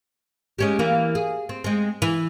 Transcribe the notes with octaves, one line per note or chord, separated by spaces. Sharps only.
G#3 C#4 G4
E3 A#3
G#4
C4
G#3 C4
E3